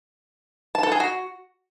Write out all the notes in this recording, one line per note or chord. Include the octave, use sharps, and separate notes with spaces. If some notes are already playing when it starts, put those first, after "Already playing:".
A5
A4
G#4
F#4